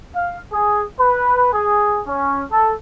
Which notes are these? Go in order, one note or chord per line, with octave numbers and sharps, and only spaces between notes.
F5
G#4
B4
G#4
C#4
A4